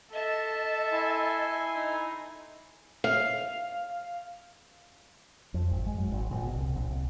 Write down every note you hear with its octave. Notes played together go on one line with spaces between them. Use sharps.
A4 D#5 E5 A5
E4 G#5 C6
D#4
F5
F2
G#1
G#3
F#2
G#1
A#1
B2
C2
A#1
C2